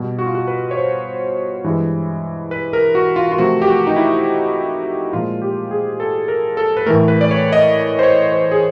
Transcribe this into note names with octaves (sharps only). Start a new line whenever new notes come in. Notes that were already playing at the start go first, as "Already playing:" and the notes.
Already playing: B2 G3
F#4
F4
F#4
B4
C#5
C5
G2 E3 G#3
B4
A#4
F#4
F4
F4
C3 F3 A3 F#4
G4
F#4
D#4
E4
A#2 F3 G#3 F4
G4
G#4
A4
A#4
A4
B4
A2 E3 A3 A#4
B4
D5
C#5
D#5
C5
C#5
C5
G#4